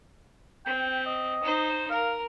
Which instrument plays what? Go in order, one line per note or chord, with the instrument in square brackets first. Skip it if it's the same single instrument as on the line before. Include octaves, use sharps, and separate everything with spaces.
[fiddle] C4 [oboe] G5
[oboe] D#5
[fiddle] D#4 C5
[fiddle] A#4 [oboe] F5